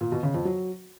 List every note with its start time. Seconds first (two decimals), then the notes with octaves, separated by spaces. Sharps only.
0.01 A#2
0.12 B2
0.23 C#3
0.34 F2
0.45 F#3